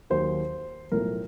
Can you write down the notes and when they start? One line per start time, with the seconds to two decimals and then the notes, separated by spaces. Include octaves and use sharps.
0.10 D#2 D#3 F#3 C5
0.92 B1 A2 F3 A#4